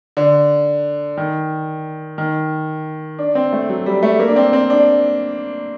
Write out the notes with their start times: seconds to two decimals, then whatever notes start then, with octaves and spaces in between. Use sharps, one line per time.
0.17 D3
1.17 D#3
2.18 D#3
3.19 D4
3.35 C4
3.53 A3
3.69 F#3
3.86 G3
4.03 A3
4.19 A#3
4.28 D4
4.36 C4
4.53 C4
4.70 D4